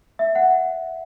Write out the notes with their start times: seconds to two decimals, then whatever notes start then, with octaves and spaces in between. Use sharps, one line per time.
0.19 E5
0.35 F#5